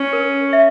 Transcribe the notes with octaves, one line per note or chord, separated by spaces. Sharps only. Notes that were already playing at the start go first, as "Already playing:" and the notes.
Already playing: C#4
A#4
E5